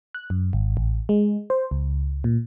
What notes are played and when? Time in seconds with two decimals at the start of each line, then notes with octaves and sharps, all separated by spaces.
0.15 F#6
0.30 F#2
0.53 G#1
0.77 A1
1.09 G#3
1.50 C5
1.71 C#2
2.24 A#2